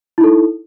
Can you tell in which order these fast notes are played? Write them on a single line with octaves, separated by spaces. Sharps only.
E4 D#4 A4